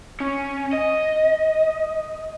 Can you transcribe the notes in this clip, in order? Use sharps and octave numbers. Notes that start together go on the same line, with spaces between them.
C#4
D#5